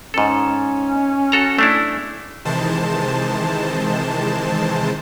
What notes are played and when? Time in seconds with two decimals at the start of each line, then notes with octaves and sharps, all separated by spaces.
0.14 G#2 C#4 A4
1.32 F#4 A4 A#5
1.59 A3 D4 E4
2.45 C3 D#3 E3 G#3 C5 A5